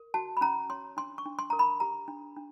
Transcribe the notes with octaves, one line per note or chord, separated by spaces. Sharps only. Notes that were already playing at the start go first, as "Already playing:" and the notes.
Already playing: A#4
F#4 A5
B5
C#4 A#5
C#5 C6
D4 C6
C#6
D4
C6
A#4 A#5
B5
G4 A#5
D4
D4